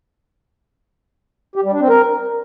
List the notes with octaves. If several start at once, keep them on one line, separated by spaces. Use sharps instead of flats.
G4
G3
D4
C4
A#4